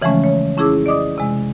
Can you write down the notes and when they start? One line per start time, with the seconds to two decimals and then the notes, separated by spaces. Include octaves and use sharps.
0.02 C#3 E3 F3 G#3 A3 C#4
0.24 C#5
0.57 F2 C#4 E4 G#4 D6 E6
0.86 D5 D#5 D6 D#6
1.18 C3 G#3